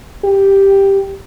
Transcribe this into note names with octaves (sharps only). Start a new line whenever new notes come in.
G4